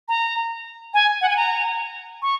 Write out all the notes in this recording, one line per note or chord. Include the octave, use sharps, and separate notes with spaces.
A#5
G#5
F#5
G#5
A#5
C#6